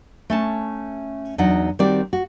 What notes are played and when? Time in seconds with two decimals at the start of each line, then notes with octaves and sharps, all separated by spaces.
0.30 A3 C#4 A5
1.38 E2 F#3 D4 D#4 F#5
1.79 D#3 G3 C4 F#4 D5
2.13 F#4